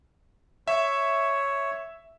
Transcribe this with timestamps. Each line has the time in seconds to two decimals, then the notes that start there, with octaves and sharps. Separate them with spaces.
0.68 C#5 E5